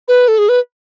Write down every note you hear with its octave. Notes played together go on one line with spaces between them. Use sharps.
B4
A4
G#4
B4